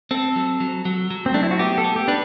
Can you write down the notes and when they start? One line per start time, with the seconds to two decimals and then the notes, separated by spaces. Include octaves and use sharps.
0.11 C4 A4
0.36 F#3
0.60 F#3
0.85 F#3
1.10 F#3
1.26 C4
1.34 A3 D4
1.43 E4
1.51 F#4
1.59 B3 G4
1.78 A4
1.84 B3
1.96 G4
2.08 D4 B4